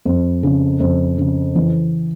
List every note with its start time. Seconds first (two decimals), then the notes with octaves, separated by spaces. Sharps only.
0.05 F2
0.43 C#3
0.80 F2
1.18 C#3
1.55 E3